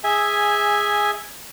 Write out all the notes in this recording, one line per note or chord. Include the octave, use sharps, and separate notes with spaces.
G#4 E5 G#5